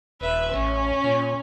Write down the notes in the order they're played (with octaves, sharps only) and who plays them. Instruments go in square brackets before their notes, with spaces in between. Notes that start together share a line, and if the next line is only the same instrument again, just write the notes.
[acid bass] D#1 [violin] B4 E5
[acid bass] A1 [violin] C#4
[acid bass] A#2